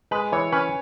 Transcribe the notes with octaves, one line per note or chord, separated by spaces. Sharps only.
G#3 B4
E3 C#5
C#4 B4